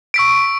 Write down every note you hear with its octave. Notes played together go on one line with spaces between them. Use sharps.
C#6 E6 B6 D7